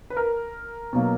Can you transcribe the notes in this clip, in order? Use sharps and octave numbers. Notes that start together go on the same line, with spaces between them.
B4
A#4
B2 F#3 A#3